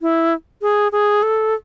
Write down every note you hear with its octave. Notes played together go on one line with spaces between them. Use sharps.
E4
G#4
G#4
A4